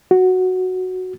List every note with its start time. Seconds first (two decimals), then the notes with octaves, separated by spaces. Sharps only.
0.11 F#4